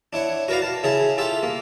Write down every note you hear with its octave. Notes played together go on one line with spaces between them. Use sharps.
D4 E4 C#5 F#5
F#4 A#4 B4 D5 F5
A5
C#3 E4 G#4 A5
F4 G4 A4 E5
A#3